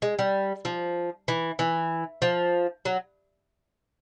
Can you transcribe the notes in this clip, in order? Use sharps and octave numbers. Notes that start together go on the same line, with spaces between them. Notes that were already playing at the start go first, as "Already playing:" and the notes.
G#3
G3
F3
E3
E3
F3
F#3